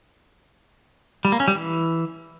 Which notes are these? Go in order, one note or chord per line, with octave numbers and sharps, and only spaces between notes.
G3
A#3
C#4
G3
E3